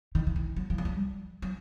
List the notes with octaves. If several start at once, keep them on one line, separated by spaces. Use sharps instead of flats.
D#3
D#3
E3
F#3
F3
F#3
G3
F#3